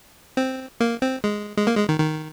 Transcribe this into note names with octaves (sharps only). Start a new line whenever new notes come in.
C4
A#3
C4
G#3
G#3
A#3
G#3
D#3
D#3